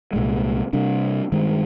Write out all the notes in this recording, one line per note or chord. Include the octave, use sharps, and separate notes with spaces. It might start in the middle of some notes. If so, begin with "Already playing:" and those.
C2 A#2 G#3
C3 G3 D4
G2 D#3 G#3